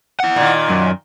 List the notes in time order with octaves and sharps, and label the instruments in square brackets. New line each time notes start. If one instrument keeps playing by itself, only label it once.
[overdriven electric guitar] E4 F#5
[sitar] A#2 D#3
[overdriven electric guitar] F#2